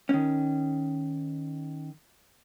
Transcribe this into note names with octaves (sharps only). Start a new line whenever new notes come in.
D#3 C#4